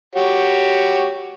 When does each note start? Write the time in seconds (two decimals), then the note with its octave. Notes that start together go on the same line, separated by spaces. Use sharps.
0.16 F#4 G4 C#5